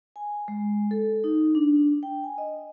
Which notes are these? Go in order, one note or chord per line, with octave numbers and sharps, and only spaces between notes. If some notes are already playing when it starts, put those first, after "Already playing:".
G#5
G#3
A4
D#4
D4
G5
G#5
D#5